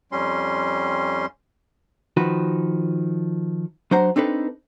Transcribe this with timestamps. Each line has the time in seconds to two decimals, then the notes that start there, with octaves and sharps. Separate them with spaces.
0.12 F2 G3 C#4 C6
2.17 D#3 F3 F#4 B4
3.91 F#3 D4 C5 F#5 A#5
4.16 C4 D4 D#4 A4 B4